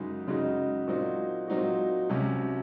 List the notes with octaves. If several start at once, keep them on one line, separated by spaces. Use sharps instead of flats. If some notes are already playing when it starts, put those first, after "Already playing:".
Already playing: F#2 C#3 G#3 D#4 F#4
F#2 C#3 G#3 D#4 F#4
A#2 F#3 C4 D#4 F#4
A#2 F#3 C4 D#4 F#4
C2 C3 F#3 C#4